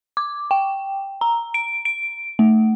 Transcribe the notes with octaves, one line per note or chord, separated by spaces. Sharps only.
D6
G5
A#5
D7
D7
A3